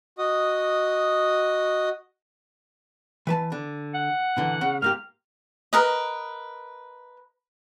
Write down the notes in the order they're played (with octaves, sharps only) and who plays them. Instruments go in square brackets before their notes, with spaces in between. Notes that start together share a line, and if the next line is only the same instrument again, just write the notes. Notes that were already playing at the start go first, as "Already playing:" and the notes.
[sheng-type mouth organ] F#4 D#5 D#6
[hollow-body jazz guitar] E3 B4 A5
D3
[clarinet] F#5
[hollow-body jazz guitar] A#2 D3 E3
C#3
[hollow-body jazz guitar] G#2 A#3 G4 [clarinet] F6
[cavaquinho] A#4 B4 D#5